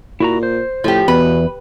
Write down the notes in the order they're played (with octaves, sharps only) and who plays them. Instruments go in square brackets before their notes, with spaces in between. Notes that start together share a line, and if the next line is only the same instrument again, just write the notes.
[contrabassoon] A#2 [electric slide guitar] E4 F#4 A#5
[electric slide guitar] C5
[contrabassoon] A2 [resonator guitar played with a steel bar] F3 G4
[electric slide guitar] E2 [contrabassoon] B2 [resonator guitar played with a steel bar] B4